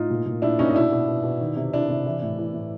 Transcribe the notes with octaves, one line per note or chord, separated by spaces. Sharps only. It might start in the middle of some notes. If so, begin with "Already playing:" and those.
Already playing: A2 D#4 F4
A#2
A#2
A#2 D4 E4
A#2 C#4 D#4
D#4
B2 D4 E4
B2
B2
B2
D#3
C3
D#3 D4 E4
C3
E3
A2
E3
A2